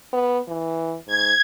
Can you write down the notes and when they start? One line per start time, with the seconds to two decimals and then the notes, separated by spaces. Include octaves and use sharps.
0.13 B3
0.48 E3
1.07 G#2 G#6